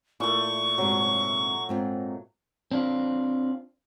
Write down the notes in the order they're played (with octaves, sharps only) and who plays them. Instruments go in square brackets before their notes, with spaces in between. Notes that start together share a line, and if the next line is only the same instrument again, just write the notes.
[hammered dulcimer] A#2 A3 [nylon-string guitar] E4 [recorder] C#6
[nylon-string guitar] G#2 C3 [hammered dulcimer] F#3
[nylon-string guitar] G#2 C4 F4
[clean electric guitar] C4 D4 F4